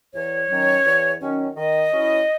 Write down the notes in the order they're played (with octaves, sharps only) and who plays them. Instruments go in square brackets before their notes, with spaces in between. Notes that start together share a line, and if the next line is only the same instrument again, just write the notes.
[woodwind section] E2 C#5
D#3 F#3 C#4
E2
D#3 F#3 C#4
D#3 D#5
F#3 C#4 E4